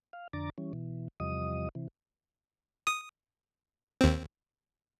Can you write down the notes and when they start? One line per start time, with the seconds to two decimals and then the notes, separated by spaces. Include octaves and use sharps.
0.13 F5
0.33 F2 D3 D4 A#5 D6 A6
0.58 E3 G3 C#4
0.73 B2 E3
1.20 E2 C3 F3 G3 D#5 D#6
1.75 C3 E3
2.87 D#6
4.01 D#2 C4